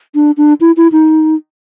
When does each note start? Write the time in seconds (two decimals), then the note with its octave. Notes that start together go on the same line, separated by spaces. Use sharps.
0.15 D4
0.37 D4
0.61 E4
0.77 E4
0.92 D#4